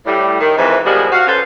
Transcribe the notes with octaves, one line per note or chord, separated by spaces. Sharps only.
A2 G3
D#3
F2 G#2 C3 E3
B2 D#3 F3 G3 G#3
F#4 F5
C#4 A4 B4 C5